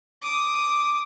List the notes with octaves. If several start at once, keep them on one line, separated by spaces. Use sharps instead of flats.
D6 D#6